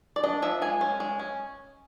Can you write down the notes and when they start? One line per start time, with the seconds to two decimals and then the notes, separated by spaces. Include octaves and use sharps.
0.16 D5
0.24 D4 D#5
0.42 F3 E5
0.62 G#3 G#5
0.81 C#4
1.00 G#3
1.19 C#4